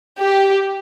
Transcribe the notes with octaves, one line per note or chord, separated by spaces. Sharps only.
G4